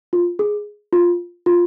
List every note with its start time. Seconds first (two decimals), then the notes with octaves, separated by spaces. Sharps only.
0.13 F4
0.39 G#4
0.93 F4
1.46 F4